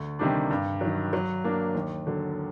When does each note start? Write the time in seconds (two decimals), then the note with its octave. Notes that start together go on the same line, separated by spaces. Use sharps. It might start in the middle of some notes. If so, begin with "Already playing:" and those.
Already playing: D2
0.19 C3 D#3 G3 D4
0.50 G2
0.81 D#3 F#3
1.13 F#3
1.44 A#3 D4
1.74 D#2
2.07 D3 F#3